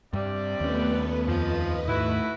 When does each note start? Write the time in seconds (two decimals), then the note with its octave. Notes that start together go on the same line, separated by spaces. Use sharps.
0.13 G2 C3 G3 D5
0.60 D#2 A3 B3 C#4 B4
1.28 F2 F3 B4 D#5
1.88 G#2 A3 E4 F#4 B4